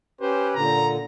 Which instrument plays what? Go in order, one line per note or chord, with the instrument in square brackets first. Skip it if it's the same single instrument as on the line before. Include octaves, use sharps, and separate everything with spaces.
[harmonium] C#4 G4 B4 [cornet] C5
[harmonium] A#2 D3 [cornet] A#5